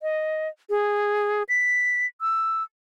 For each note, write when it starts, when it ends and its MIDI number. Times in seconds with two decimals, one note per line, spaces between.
0.02 0.48 75
0.70 1.43 68
1.49 2.06 95
2.21 2.63 88